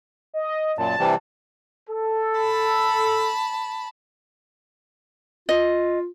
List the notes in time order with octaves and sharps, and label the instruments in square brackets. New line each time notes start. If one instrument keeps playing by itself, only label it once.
[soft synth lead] D#5
[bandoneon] F#2 A#2 [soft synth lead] A5
[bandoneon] C3 E3 G3
[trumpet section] A4
[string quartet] A5 B5
[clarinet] F4 [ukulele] D#5